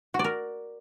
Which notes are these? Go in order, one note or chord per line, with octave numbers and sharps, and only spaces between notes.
F#4
D5
A#4